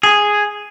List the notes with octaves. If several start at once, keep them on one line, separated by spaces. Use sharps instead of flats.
G#4